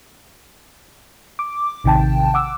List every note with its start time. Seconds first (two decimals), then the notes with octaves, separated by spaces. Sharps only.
1.39 D6
1.84 A1 C3 D#3 G5 A5
2.34 F#5 D6 E6